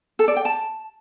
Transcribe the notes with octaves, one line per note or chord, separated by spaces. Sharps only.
A4
D5
G5
A5